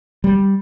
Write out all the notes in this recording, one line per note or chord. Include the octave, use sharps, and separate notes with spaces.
G3